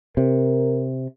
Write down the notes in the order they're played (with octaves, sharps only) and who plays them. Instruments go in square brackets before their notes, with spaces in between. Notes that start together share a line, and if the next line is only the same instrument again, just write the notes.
[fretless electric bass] C3 [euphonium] A#4